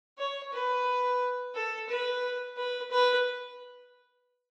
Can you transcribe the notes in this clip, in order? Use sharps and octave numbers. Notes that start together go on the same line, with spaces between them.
C#5
B4
A4
B4
B4
B4